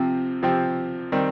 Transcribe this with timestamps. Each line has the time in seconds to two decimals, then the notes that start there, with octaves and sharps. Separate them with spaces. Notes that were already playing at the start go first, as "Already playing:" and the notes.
Already playing: C3 F3 C4 G4
0.42 C3 F3 C4 G4
1.12 D#3 G3 C4